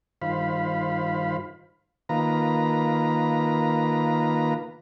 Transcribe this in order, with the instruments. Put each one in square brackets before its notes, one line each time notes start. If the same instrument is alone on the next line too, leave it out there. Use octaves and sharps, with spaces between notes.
[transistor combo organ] G2 D#3 F4 C5 F5 B5
D#3 A#3 F4 B4 A#5